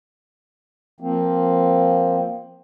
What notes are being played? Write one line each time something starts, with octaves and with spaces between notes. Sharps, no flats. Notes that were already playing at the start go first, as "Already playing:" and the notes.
F3 A#3 C4